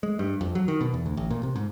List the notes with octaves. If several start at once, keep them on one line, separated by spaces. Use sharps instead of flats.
G#3
G2
F2
F#3
D#3
B2
E2
D2
A1
A#2
C3
G#2